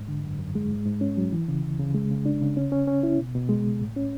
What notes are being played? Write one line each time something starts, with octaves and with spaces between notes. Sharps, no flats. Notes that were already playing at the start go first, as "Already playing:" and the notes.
Already playing: G#2
D3
F#2
F#2
G#3
G#2
G#2
C#4
F#3
E3
C#3
D2
C#3
G#3
C#3
D4
C#3
C#4
C#4
C#4
E4
B2
B2
G#3
C#2
A2
C#4